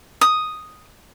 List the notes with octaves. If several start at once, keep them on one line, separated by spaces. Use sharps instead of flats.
D#6